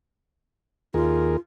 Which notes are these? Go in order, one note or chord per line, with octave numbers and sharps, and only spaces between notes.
D#2 F4 G#4 A#4